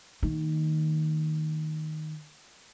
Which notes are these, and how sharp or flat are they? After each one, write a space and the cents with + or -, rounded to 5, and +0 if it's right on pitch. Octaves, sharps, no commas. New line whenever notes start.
D#3 +0 A#3 -40